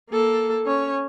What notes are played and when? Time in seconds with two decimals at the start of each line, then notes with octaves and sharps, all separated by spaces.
0.10 A#3 A4
0.66 C#4 C#5